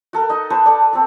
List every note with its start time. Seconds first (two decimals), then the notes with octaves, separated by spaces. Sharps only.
0.13 F#4 A4 A#4
0.29 D#4 D#5
0.50 B4 C5 A5 C#6
0.66 A4 D5
0.93 C4 A4